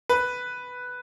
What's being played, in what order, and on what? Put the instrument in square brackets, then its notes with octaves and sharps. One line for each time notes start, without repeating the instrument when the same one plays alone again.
[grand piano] B4